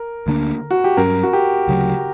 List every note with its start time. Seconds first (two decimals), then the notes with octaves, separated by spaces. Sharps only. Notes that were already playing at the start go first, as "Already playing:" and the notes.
Already playing: A#4
0.27 D2 D3 A#3 D4
0.71 F#4
0.84 G4
0.97 G2 F#3 C#4 A#4
1.23 F#4
1.33 G4
1.68 D2 C#3 F#3